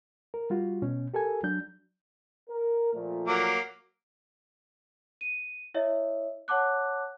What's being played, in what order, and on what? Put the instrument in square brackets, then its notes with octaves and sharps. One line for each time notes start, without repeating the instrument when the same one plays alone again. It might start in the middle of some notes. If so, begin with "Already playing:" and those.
[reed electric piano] A#4
G3 F4 F#4
B2 C#4
G4 A4 A#4 G#5
F#3 D4 G6
[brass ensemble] A#4
A#2 F3 A3
[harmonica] F#3 A#3 D6
[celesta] D#7
E4 C#5 D#5 E5
C#5 F#5 A5 D6 F#6